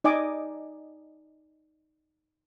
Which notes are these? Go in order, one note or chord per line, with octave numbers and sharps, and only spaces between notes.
D#4 D5 D#5 G#5 D6